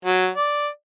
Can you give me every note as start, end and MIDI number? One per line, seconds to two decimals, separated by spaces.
0.05 0.29 54
0.37 0.68 74